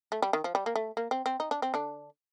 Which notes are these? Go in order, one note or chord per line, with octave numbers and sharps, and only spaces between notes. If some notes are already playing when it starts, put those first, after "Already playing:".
A3
G3
D#3
F3
G3
A#3
A3
A#3
C4
C4
D#4
D4
C4
D3 D4